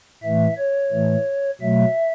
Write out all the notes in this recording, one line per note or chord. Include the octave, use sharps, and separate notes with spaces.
A2 E3 A3 E5
C#5
A2 E3 A3
B2 F#3 A3 E5